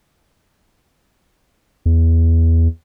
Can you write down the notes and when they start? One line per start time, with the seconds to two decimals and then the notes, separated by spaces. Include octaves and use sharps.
1.86 E2